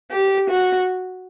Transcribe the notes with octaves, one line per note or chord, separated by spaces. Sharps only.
G4
F#4